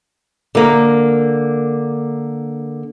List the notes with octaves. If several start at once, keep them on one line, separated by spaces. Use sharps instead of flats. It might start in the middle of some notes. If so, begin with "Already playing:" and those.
D3 A#3